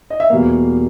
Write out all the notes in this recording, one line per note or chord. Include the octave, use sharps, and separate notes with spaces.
D#5
E5
E2 B2 G3 A#3 F5